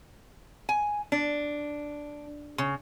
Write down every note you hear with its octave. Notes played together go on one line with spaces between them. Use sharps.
G#5
D4
C#3